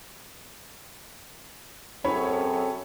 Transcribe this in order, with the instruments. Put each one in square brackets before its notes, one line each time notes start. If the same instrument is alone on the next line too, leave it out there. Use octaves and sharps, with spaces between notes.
[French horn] F#2 [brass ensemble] C4 G#4 A4 [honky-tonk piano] C#4 [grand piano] B5